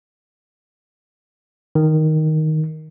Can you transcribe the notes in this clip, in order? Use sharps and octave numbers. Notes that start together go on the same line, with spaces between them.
D#3